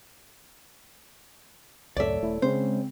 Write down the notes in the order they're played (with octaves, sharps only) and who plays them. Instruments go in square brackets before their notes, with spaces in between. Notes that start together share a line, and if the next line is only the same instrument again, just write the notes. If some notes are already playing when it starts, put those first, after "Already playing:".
[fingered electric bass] C#2 F#2 A2 [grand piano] A4 C#5 [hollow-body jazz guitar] D5 E5
[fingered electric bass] D#1 A3 [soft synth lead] E4
[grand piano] C#3 C#4 [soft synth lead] G#3 [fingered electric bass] C4 [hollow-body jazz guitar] C5